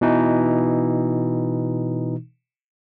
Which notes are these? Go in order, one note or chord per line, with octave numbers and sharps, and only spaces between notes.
B2 E3 D#4